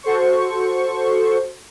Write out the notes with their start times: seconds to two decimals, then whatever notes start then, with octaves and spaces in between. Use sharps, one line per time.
0.03 F#4 A4 C5 C#6